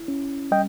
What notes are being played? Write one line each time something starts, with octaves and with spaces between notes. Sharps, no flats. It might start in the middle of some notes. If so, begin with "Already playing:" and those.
Already playing: E4
C#4
G3 D#5 G5